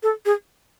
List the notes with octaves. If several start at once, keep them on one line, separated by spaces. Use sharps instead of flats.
A4
G#4